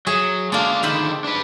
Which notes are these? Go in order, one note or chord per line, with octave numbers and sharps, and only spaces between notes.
F#3 G#4 E5
G#3 A#3 D4 F5
D3 D#3 C5 E5 B5
D4 B4